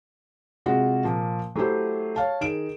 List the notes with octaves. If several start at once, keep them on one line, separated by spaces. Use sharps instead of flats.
C3 G#3 F4 F#4
A#2 F3 A#3
F#3 A3 E4 G4 C5
C#5 F5 A5
D#3 G#4 D7 E7